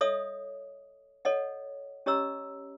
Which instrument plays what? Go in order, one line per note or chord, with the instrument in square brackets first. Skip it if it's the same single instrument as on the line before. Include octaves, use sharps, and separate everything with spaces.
[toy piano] A4 C#5 D#5 E5 D#6
A4 C#5 D#5 F#5
C#4 G4 C#5 D#5 A#5 E6